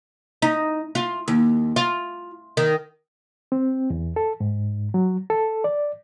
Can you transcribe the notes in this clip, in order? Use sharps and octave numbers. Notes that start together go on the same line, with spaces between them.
D#4
F4
D#2
F4
D#3
C4
E2
A4
G#2
F#3
A4
D5